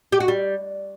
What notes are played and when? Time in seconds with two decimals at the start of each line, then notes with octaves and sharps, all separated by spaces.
0.12 G4
0.20 F#4
0.28 G3